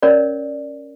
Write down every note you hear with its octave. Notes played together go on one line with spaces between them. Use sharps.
C#4 A#4 C#5 D5